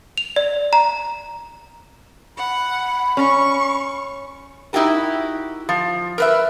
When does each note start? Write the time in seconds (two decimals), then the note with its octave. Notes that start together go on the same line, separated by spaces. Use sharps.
0.18 F7
0.36 D5
0.73 A#5
2.38 F#5 B5
3.17 C#4 C#6
4.73 D#4 E4 F#4 G4 A#4
5.69 F3
6.18 A#4 B4 E5